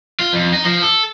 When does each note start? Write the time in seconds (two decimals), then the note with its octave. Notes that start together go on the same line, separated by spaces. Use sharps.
0.20 F4
0.33 F2
0.53 D#4
0.65 F3
0.82 A4